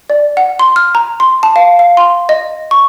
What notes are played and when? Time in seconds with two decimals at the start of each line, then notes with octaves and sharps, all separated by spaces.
0.10 D5
0.37 F#5
0.59 C6
0.76 F6
0.95 A#5
1.20 C6
1.43 A5
1.56 F5
1.79 F5
1.97 C6
2.29 D#5
2.71 C#6